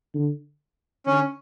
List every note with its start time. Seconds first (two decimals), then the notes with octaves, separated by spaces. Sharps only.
0.14 D3
1.06 D3 C#4